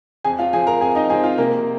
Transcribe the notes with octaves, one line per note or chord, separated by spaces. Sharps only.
F2 G#4 G#5
F4 F5
F3 C4 G#4 G#5
A#4 A#5
F2 G#4 G#5
D#4 D#5
F3 C4 G#4 G#5
F4 F5
C3 A#3 A#4